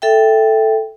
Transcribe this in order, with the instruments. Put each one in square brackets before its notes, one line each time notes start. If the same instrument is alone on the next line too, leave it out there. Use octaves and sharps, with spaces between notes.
[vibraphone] A4 E5 G5